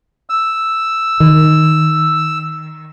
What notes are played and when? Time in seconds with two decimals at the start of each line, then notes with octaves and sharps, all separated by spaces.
0.29 E6
1.20 D#3